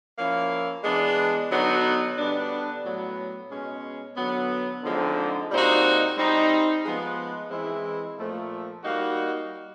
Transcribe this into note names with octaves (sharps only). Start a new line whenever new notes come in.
F3 A#3 C#4 E4
E3 G#3 B3 D4
D3 F#3 B3 D#4 F#4
D3 G3 B3 D4
A2 F#3 B3
B2 G#3 C#4
D3 F#3 B3
D3 F3 G#3 C4 D#4
A#2 G3 C4 D#4 F#4
G3 C4 D#4
F3 G#3 B3
E3 G#3 C4 E4
A#2 F3 A3
G3 A#3 D#4 F#4